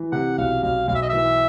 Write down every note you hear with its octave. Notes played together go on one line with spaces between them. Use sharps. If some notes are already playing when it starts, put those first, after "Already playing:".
Already playing: E3
C3 F#5
B1 F5
B1 F5
B1 F5
E5
D#5
E3 E5